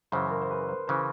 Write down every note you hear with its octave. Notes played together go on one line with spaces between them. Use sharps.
F#2 C#3 E3 C5
A#4
C5
B4
C5
C#3 E3 C5